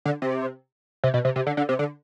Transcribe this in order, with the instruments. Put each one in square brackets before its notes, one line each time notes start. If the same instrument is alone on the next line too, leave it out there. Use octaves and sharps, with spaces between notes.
[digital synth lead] D3
C3
C3
B2
C3
C3
D3
D3
C3
D3